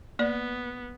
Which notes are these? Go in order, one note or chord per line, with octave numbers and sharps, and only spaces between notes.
A#3 B3 D5